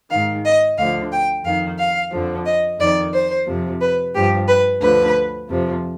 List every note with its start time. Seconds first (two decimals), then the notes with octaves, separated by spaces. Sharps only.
0.10 G#2 D#3 F5
0.45 D#5
0.78 D2 D3 F3 F5
1.12 G5
1.44 F2 D#3 F5
1.78 F5
2.12 F2 D3 F3
2.46 D#5
2.79 F2 D#3 D5
3.13 C5
3.46 F2 C3 F3
3.80 B4
4.14 G2 F3 G4
4.48 B4
4.81 D2 D3 F3 B4
5.48 F2 C3 F3